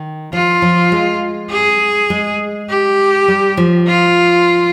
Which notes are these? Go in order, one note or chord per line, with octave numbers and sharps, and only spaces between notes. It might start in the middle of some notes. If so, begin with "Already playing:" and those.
Already playing: D#3
F3 F4
F3
G#3
G#4
G#3
G4
G3
F3
F4